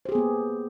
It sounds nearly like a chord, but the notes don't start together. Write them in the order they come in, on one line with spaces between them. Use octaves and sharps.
C5 G4 G#4 B3 A#3